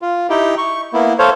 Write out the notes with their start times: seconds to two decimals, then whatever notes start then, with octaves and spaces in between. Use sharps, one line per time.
0.02 F4
0.30 D#4 E4 G4 G5
0.58 C#6
0.93 A#3 B3 E4
1.19 A4 C5 C#5 F5